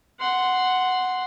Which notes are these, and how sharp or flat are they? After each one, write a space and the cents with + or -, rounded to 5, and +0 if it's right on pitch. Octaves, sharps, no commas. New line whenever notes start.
F#5 +0 C6 -5